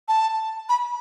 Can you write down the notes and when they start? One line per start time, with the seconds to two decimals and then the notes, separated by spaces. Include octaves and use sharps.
0.08 A5
0.69 B5